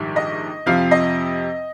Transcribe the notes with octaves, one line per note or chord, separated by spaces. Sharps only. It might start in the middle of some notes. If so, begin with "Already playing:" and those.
Already playing: A#1 G#2 D#3 G3
D#5
F2 C3 F3 F5
D#5